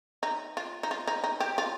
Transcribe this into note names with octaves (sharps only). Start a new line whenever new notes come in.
D#4
F4
D#4
F4
D#4
D#4
G4
F4